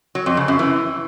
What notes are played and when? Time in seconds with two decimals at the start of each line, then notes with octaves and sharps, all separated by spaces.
0.15 F#3
0.26 F2
0.37 C#3
0.48 F#2
0.59 E3